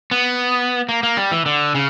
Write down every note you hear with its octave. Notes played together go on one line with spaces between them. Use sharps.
B3
A#3
A#3
G3
E3
D3
C#3